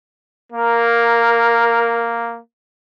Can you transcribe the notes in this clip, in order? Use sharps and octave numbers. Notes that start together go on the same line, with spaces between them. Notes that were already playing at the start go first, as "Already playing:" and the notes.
A#3 A#4